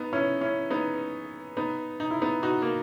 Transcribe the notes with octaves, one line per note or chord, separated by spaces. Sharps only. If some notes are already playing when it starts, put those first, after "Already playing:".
Already playing: B3 D#4
C#4 E4
C#4 E4
B3 D#4
B3 D#4
D#4
E4
B3 D#4
D#4 F#4
A#3